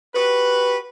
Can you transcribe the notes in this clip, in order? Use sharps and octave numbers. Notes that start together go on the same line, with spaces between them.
F#4 G4 B4